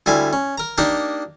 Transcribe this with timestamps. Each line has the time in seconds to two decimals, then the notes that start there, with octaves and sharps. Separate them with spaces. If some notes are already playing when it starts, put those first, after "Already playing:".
0.06 D2 G3 E4 F5 G#5
0.33 C#4
0.58 A#4 A#5
0.78 A#3 D4 D#4 G4 A#4 G5